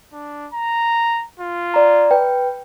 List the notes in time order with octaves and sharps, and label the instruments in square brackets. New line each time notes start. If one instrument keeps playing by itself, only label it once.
[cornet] D4
A#5
F4
[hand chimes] D5 A#5
B4 G5